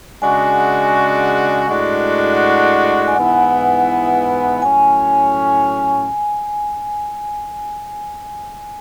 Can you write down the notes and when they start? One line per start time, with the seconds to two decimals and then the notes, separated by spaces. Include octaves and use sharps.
0.22 C#3 G#3 D4 F#4 G#5
1.68 A2 G#3 D4 F#4
3.08 G#5
3.15 G#2 E3 B3 E4 F#5
4.62 A2 F#3 C#4 G#5